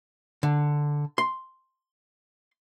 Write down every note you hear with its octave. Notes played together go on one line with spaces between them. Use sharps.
D3
C6